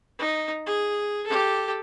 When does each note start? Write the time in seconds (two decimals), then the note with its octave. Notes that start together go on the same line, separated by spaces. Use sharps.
0.19 D#4
0.66 G#4
1.26 G4 A4